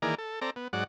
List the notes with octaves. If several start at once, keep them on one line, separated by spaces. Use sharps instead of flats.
D#3 E3 A#3 G#4 A#4 D5
A4
C4 A4 D5 A#5
B3
G#2 F#3 D5 F#5